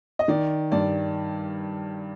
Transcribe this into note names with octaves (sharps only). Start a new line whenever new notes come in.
D#5
D#3 D5
G2 D5